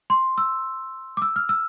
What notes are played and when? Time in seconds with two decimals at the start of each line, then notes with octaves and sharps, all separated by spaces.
0.10 C6
0.38 E6
1.17 D6
1.22 E6
1.36 F6
1.49 E6